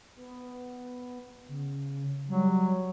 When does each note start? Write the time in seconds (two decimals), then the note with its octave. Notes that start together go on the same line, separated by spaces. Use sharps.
0.16 B3
1.48 C#3
2.28 F#3 G3